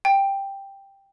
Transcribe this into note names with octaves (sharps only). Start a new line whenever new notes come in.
G5